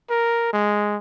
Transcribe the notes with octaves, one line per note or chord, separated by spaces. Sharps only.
A#4
G#3